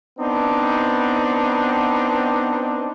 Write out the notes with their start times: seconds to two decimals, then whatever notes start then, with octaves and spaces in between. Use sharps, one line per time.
0.18 B3 C4 D4 D#4